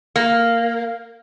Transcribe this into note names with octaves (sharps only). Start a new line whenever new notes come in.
A#3